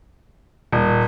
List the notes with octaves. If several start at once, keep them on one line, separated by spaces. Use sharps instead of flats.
D#1